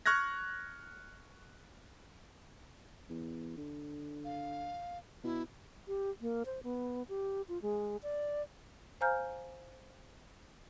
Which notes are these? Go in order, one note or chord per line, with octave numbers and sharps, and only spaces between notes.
C#6 F6 F#6 G#6 A#6
E2
D3
F5
B2 E4
G4
A#3
C5
B3
G4
F4
G#3
D5
C5 F5 G#5 A#5 F6 G6